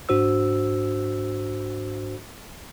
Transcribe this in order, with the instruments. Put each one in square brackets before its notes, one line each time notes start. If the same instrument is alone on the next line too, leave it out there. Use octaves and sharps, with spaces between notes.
[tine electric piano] G#2 D4 F#4 C5 E6